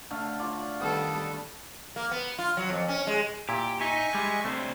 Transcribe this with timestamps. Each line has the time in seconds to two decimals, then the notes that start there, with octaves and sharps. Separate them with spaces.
0.10 D3 A3 F5
0.39 F4 D5
0.81 D#3 G3 B3 A4
1.96 A#3
2.11 B3
2.39 F4
2.57 F#3
2.70 F2
2.88 C#4
3.07 G#3
3.49 A#2 E4 G4
3.81 D#4 E5 G#5 C#6
4.14 G3 G#3
4.45 C3 A3 D4 C5